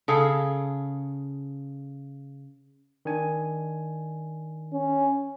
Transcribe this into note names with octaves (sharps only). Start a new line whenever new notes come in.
C#3 G#4 A4
D#3 D4 G#5
C#4